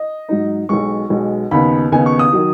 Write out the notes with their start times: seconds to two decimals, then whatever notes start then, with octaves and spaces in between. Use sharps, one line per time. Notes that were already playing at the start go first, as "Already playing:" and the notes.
Already playing: D#5
0.29 G#2 F#3 D#4
0.69 B1 B2 G#3 C#6
1.10 B1 B2 G#3
1.51 D#2 C#3 B3 D#4 B5
1.92 D#2 C#3 B3 D#4 G#5
2.06 C#6
2.19 D#6
2.33 D#3 F#3